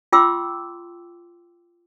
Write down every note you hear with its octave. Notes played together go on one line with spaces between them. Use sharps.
F4 G5 C6 D6 E6